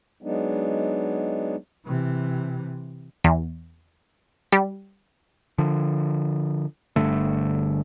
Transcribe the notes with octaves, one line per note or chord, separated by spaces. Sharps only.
F#3 G#3 B3 D4 D#4
C3 E3
E2
G3
D3 F3
G1 G2 D3 A3